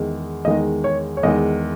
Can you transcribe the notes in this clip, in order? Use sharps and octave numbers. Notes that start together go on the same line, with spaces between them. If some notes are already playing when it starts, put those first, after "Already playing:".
Already playing: E2 D#3 G#3
E2 D#3 G#3 D#5
C#5
C#5
E2 D#3 G#3 D#5